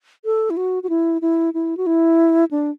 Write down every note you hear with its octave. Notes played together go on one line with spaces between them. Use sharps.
A4
E4
F#4
F#4
E4
E4
E4
F#4
E4
D4